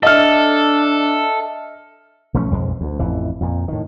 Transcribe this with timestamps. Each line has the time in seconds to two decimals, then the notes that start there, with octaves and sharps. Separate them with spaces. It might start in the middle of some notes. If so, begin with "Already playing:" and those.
0.03 D4 A4 D#5 E5 F6
2.34 B1 F3 A3 C#4
2.51 B1 F2 G#3
2.81 D2
2.99 A1 F2 E3
3.41 F2 A#2
3.68 A2 D#3